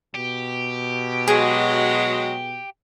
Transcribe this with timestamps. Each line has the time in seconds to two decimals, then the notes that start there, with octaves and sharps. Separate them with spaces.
0.15 B2 G4
1.28 F#3 G#3 G#4